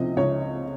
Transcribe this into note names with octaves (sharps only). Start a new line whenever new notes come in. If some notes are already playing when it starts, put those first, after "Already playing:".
Already playing: C#2 C3 F3 C4 D#5
C#2 C#5